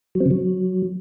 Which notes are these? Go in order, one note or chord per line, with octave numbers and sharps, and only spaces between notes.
F#3
C4
C#3
F#3